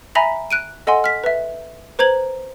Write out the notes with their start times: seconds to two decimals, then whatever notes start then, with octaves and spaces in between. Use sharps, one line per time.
0.15 E5 G#5 A#5 B5 A#6 B6
0.51 F#6 D7 D#7
0.87 A4 D#5 F#5 G#5 C6
1.04 F6 B6
1.24 B4 E5
1.99 B4 C5 A#5 G#6 F#7